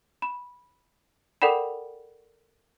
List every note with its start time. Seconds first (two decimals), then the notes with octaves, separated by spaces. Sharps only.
0.22 B5
1.42 A4 A#4 D5 F#5 G5 B5